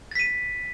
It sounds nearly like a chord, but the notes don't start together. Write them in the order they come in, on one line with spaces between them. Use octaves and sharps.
A6 B6 D#7